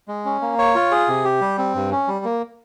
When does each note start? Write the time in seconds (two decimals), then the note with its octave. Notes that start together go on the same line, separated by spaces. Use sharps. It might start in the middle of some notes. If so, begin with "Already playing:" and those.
0.08 G#3
0.25 C#4
0.42 A#3
0.58 C#5
0.75 F4
0.91 G#4
1.08 C3
1.25 G4
1.41 G3
1.58 C4
1.75 G2
1.92 C#4
2.08 G3
2.25 A#3